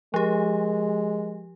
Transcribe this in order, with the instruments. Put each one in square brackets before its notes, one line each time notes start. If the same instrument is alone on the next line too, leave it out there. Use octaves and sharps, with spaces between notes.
[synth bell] F3 G4 [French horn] G#3